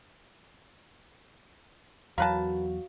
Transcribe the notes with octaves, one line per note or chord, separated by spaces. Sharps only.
E2 F#3 F#4 A#4 B4 C#5 F5 A5